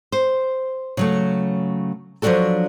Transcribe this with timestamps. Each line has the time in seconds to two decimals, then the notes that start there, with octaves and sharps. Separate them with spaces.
0.12 C5
0.97 C#3 F#3 A3
2.22 F3 F#3 C4 D4 F#4 A4